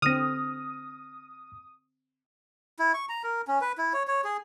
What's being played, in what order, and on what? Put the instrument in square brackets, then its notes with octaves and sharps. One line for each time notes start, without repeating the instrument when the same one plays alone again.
[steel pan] D3 C4 [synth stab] D#6 [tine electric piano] F6 A#6
[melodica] E4
C#6
A#5
A#4
C#4
B4
E4
C#5
C#5
G#4